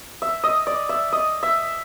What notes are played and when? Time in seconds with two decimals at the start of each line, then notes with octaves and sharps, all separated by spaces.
0.22 E5
0.44 D#5
0.67 D5
0.89 E5
1.12 D#5
1.43 E5